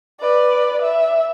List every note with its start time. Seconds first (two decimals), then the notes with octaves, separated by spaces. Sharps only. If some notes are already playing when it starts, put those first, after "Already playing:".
0.21 B4 D5
0.82 E5